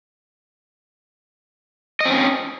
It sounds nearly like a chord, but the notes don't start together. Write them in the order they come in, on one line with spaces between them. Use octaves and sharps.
D#5 C4 C#4